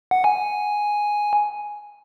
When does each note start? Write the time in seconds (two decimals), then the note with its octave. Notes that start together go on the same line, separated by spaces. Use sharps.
0.11 F#5
0.24 G#5